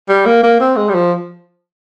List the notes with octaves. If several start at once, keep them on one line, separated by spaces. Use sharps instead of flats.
G3
A#3
A#3
C4
G#3
G3
F3